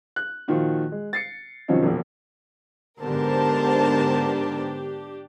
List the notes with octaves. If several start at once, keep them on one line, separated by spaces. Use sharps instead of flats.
F#6
A#2 D#3 F3 F4 F#4
G#3
A6 C7 C#7
F#2 C3 D#3 F3 C#4 D#4
E1 A#1
G#2 D3 B3 D4 G4 A#4 C5 A5